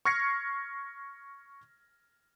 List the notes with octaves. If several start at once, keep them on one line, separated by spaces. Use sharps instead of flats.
C#6 F6 G#6 A#6 C7 C#7